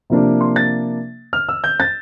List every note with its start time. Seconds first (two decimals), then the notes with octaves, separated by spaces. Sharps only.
0.10 C3 F3 A#3 D4
0.41 C6
0.56 A6
1.33 F6
1.49 E6
1.64 G6
1.80 A6